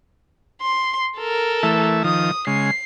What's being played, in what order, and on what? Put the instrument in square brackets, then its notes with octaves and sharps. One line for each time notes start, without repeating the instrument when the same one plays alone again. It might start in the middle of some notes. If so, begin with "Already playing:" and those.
[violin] C6
A4 A#4
[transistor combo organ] E3 A3 E5
[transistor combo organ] D#3 F3 [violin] D#6
[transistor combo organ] C#3 G#3 [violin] C7